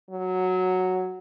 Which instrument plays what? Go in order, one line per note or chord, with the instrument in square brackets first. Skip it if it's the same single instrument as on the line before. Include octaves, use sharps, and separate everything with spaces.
[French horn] F#3